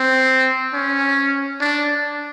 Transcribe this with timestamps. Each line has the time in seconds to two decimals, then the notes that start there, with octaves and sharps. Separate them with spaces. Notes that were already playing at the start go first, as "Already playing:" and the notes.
Already playing: C4
0.73 C#4
1.61 D4